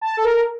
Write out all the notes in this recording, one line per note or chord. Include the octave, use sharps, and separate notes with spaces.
A5
A4
A#4